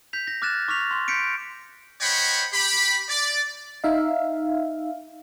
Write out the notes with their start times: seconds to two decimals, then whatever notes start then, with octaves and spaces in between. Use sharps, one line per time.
0.13 G6 B6 F7
0.27 A#6
0.42 D6 F6 F#6 A6 A#6 E7
0.68 C#6 D6 F6 B6 F7
0.91 C6
1.08 G6 B6 C#7 D7
2.01 C5 C#5 D#5 F#5 G5 B5
2.52 G4 B5
3.09 D5
3.84 D#4 E5 F5